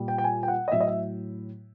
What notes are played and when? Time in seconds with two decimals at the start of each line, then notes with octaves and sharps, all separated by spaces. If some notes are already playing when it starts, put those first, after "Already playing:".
Already playing: A#2 G3
0.08 G5
0.18 G5
0.24 G#5
0.43 G5
0.48 F#5
0.68 D#5
0.72 A2 F#3 E5
0.80 D#5
0.87 E5